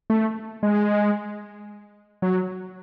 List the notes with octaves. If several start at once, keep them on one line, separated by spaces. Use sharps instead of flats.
A3
G#3
F#3